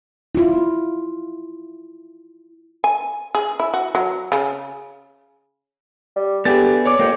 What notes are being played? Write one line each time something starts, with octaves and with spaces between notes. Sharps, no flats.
E4 F4
G#5
G#4
E4
F#4
F#3
C#3
G3
D3 B3 G4 G#4 A6
C#5 D5 D6
F2 A#3 G4